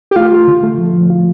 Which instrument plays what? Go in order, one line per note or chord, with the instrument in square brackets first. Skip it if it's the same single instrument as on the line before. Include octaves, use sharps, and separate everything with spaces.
[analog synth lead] G4
[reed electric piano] A3 [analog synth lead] F4
[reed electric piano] A3
D3
A3
F3
F3
F4